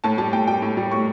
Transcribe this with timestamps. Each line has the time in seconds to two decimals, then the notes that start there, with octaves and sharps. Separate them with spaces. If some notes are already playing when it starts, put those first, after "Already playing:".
0.04 A2 A5
0.18 G3 A5
0.33 A2 G5
0.48 G3 G5
0.62 A2
0.77 G3
0.91 A2 C#6